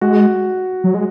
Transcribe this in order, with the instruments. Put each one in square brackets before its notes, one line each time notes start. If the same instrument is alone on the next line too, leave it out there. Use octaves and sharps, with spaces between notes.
[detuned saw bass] G#3 [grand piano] F#4
[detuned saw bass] F#3
G#3